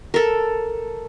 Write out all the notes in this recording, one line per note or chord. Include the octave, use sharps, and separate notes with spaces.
A4 A#4